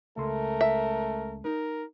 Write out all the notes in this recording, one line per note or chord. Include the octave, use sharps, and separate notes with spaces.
C#2 A3 A4 A#4 C6
E5
D#4 A#4